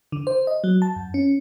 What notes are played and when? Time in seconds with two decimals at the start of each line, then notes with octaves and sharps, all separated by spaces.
0.12 D3
0.27 C5
0.47 D#5
0.64 F#3
0.82 A5
0.96 F#2
1.14 C#4